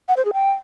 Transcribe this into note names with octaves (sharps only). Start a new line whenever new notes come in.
F#5
C5
G#4
G5